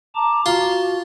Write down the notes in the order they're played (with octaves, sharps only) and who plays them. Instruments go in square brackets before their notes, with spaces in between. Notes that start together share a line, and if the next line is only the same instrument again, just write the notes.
[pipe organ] A5 A#5 D6
[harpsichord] F4 [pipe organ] F#4